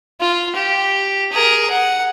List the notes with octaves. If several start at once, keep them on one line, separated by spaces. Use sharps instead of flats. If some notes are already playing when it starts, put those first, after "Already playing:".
F4
G4
G#4 A#4
F#5